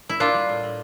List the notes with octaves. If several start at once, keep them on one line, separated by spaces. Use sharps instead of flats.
E4
A#3 D4 F4
G3
A2
A2